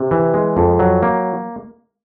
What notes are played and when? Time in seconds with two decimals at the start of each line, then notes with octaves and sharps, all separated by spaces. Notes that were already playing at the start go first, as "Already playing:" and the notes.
Already playing: C3
0.11 E3
0.34 G#3
0.57 F2
0.79 F#3
1.03 A#3